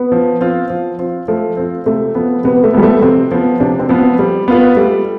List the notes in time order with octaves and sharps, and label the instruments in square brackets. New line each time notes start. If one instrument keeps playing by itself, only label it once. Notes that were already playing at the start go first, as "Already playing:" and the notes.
Already playing: [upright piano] B3
[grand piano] F3
C4 F4
F3
C4 F4
[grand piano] F3 [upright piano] A3
[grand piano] C4 F4
[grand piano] C3 [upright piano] A3
[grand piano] F3 B3
[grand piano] C3 [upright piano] B3
[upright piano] A3
[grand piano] F3 B3 [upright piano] G3
[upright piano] A3
[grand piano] C3 [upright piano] C4
[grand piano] F3 B3
[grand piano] C3 [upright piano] D4
[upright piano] C4
[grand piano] F3 B3
[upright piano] C4
[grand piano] G3
B3 F4 B4
[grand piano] G3 [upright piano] A3